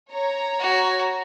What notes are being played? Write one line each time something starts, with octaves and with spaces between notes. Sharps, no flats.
C#5 A#5
F#4